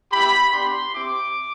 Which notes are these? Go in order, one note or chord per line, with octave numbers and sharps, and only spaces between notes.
B3 E4 G4 B5
B3 D4 G4 C6
C4 E4 G4 D6